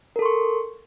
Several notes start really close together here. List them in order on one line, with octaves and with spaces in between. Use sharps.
A#4 A4 C6 C#6